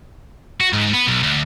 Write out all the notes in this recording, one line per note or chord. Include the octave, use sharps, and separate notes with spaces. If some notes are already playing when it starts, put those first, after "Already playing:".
F#4
G#2
B3
B1
D2